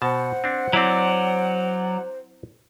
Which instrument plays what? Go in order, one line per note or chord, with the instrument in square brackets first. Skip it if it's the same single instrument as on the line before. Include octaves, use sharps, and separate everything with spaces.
[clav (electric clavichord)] B2 A5 [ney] C5 [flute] F#5
[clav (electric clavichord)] C4 D4
[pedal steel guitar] F#3 D5 [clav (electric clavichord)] C4 E4